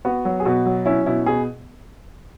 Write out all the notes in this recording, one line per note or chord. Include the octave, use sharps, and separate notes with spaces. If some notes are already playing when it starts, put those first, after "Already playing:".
B3 F#4
F#3
G#4
B2 F#4
F#3
C#4 E4
B2 E4
B2 G#4